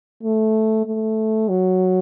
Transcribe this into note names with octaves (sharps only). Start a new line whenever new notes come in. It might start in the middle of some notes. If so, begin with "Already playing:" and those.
A3
A3
F#3